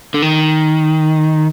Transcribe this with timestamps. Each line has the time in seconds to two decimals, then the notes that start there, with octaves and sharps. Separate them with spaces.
0.14 D3
0.22 D#3